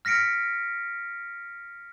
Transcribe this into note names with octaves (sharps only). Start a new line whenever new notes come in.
F6 A#6 B6 C#7 D7